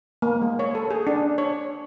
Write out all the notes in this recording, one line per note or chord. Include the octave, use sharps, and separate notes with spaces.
A#3
G#3
C#5
A4
G#4
D4
C#5